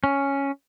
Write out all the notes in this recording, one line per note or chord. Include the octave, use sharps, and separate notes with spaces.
C#4